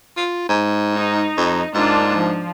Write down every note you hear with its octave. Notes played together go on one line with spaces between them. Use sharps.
F4
G#2
D#4
F2
G#2 A#3 D4 F4
F3